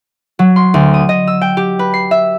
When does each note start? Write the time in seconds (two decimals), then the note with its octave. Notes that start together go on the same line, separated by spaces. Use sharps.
0.39 F#3
0.56 C6
0.74 D2
0.94 D#6
1.09 D#5
1.27 E6
1.41 G5
1.57 G4
1.79 B4
1.94 C7
2.11 E5